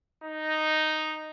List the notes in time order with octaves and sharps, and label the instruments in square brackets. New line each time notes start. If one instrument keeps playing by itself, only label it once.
[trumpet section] D#4